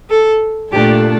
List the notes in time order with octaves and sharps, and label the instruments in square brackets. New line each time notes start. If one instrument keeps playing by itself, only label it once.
[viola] A4
[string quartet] A#2 A3 D4 A4 [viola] G4